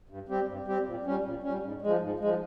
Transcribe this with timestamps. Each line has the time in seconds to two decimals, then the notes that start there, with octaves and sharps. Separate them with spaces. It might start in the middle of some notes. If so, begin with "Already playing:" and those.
0.09 G2
0.28 G3 C4 G4
0.48 G2
0.66 G3 C4 G4
0.86 A#2
1.05 G3 C#4
1.25 A#2
1.43 G3 C#4
1.63 G#2
1.82 F3 G#3
2.01 G#2
2.20 F3 G#3